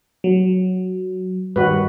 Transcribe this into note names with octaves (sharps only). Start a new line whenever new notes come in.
F#3
G2 D#3 F#4 B4